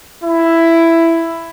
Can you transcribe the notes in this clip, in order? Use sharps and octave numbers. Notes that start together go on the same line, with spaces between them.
E4